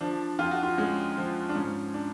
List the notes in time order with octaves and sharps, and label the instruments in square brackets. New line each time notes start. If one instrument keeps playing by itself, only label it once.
[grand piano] F3 D4
F2 F4
F#4
F4
G#3 C#4
F3
D4
G#2 C#4
D4